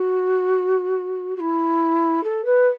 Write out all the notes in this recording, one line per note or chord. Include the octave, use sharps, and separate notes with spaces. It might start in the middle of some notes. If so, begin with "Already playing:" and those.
Already playing: F#4
F#4
E4
A4
B4